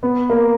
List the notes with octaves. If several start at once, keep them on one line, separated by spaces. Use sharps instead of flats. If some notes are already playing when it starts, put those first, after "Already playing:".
B3
A#3